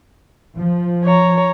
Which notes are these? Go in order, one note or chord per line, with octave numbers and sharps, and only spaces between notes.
F3
C#5 A#5